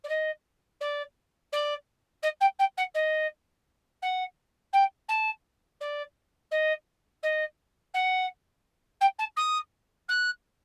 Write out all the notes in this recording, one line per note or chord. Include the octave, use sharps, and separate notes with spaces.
D5
D#5
D5
D5
D#5
G5
G5
F#5
D#5
F#5
G5
A5
D5
D#5
D#5
F#5
G5
A5
D#6
F#6